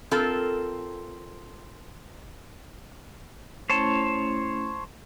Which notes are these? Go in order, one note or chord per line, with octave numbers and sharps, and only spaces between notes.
C4 F4 A4 A#4
A3 C#4 E4 C5 C#5 A5